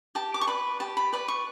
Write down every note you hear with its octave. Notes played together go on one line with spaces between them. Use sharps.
G4 A5
D6
C#6
B4 D5 B5
G4 A5
B5
B4 D5 B5
C#6